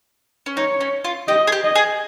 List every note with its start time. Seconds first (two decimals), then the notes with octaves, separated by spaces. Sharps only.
0.46 C#4
0.57 D#4 C#5
0.81 C#4
1.05 F4
1.28 G4 D#5
1.47 G#4
1.52 G4
1.64 D#5
1.76 G#4